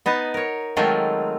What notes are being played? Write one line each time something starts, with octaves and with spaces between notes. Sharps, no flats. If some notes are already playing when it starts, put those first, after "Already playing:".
B3 D#4 B4 A5
A#4 C#5
D#3 F#3 G#3 A3 C4 F4